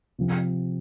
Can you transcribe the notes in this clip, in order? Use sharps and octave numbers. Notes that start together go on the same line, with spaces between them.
C3 F3 C4